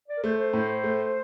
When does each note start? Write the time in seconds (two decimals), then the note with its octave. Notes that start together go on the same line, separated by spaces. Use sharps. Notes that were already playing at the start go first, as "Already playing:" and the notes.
0.08 D5
0.17 A#4
0.23 A3 C5
0.38 C5
0.53 A2
0.84 A3